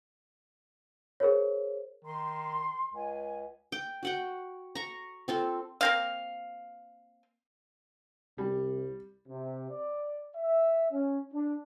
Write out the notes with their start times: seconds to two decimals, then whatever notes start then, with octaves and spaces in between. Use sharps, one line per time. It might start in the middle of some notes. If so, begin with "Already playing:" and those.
1.20 G#4 A#4 C5 C#5
2.05 D#3 C6
2.94 C#2 G#5
3.72 G5
4.03 F#4 F#5 G5
4.75 A#5 C#6
5.28 C4 F4 A4
5.81 A#3 C4 F5
8.38 C2 G3
9.28 C3
9.71 D5
10.36 E5
10.91 C#4
11.33 D4